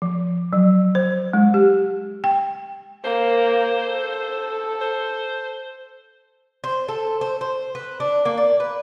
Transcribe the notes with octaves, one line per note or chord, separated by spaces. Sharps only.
F3
F#3
C5
G#3
G4
G5
A#3 C5
A4
C5
C5
A4
C5
C5
B4
D4
A#3
D5
B4